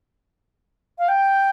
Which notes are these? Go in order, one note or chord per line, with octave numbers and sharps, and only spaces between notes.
F5
G5